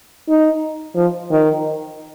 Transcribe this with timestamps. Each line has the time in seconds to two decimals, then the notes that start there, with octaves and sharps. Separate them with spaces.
0.29 D#4
0.96 F3
1.30 D#3